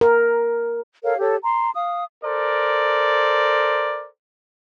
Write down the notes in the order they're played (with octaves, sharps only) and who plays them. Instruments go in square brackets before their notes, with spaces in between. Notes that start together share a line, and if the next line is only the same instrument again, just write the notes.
[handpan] A#4
[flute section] A4 A#4 C#5 F5
G4 A4 C#5
A#5 C6
F5 D#6
[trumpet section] A4 A#4 C5 D5